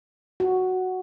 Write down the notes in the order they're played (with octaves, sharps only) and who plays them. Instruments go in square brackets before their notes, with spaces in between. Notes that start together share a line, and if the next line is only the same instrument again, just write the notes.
[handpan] F#4